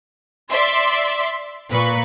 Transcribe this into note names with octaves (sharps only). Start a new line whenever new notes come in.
D5 E5 C6
A#2 B4 C#6